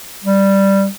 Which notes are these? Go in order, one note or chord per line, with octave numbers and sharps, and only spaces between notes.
G3